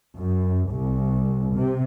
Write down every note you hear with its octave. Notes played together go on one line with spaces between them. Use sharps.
F#2
C2
C3